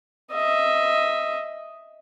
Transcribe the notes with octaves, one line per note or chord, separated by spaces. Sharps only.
D#5 E5